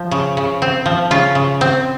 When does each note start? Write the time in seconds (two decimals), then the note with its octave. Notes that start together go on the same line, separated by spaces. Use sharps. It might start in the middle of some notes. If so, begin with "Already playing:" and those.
Already playing: F3
0.11 C#3
0.37 C#3
0.62 C4
0.86 F3
1.11 C#3 F4
1.35 C#3
1.61 C4